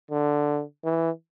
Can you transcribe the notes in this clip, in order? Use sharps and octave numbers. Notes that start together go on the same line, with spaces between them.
D3
E3